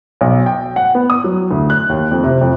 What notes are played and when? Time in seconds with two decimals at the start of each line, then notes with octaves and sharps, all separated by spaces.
0.21 B1
0.46 G5
0.76 F#5
0.95 B3
1.10 D#6
1.24 F#3
1.51 D2
1.70 F#6
1.89 D#2
2.11 F2
2.24 C3
2.41 F2